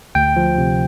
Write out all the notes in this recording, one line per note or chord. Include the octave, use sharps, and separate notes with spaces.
D2 G5
F3
C3